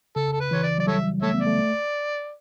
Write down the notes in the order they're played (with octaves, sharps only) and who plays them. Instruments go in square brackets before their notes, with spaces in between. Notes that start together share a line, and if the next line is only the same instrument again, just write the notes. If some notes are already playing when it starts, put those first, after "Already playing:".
[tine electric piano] C#3 [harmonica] A4
[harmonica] A4
B4
[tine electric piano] E3 [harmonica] C#5
[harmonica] D5
[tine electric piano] F#3 [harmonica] D5
[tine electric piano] G3 [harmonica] A4 C#5 E5
[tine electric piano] A3 [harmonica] A4 C#5 E5
[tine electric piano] B3
[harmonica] D5
[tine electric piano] A3